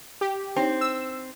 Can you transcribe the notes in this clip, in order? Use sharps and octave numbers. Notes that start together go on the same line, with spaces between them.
G4
C4 D4 D#4 C#5
E6